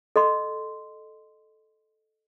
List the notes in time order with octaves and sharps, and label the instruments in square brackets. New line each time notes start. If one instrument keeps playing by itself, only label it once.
[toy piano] A4 D#5 C6